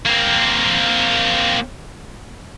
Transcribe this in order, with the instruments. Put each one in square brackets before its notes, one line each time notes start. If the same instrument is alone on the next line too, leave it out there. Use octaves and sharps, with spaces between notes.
[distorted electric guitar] A#3 C4